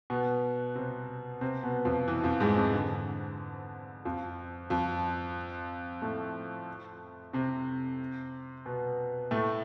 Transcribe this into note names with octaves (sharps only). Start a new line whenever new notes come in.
B2 B3
C3 C4
C3 C4
B2 B3
F2 F3
E3
F2 F3
G#2 G#3
F2 F3
D3
F2 F3
F2 F3
A2 A3
C3 C4
B2 B3
A2 A3